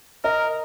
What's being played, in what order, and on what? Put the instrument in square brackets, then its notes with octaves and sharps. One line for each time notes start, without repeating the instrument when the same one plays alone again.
[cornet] A#4 [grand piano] D#5